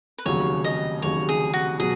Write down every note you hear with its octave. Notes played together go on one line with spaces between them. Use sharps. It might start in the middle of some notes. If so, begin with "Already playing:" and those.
B4
F1 D#2 C#3 F#3 C#5
D#5
F1 D#2 C#3 F#3 C#5
G#4
F#4
B2 F#3 G#4